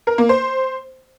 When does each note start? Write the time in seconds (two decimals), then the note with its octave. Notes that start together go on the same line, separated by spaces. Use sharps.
0.07 A#4
0.18 A#3
0.29 C5